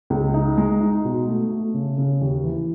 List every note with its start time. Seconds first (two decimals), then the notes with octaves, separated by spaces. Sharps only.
0.10 C#2
0.34 D#4
0.57 G#3
0.80 D#4
1.04 B2
1.28 A3
1.51 A3
1.74 C#3
1.98 C#3
2.21 D#2
2.44 E3